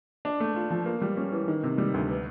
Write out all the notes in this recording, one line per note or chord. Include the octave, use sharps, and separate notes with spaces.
D4
A3
F4
F3
A#3
G3
C#4
E3
D#3
C3
G3
D2
B3